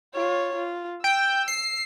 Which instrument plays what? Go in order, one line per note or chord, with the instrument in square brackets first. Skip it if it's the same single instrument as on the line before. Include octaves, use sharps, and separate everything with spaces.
[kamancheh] F4 C#5
F4
[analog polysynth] G5 [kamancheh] E6
[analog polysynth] C7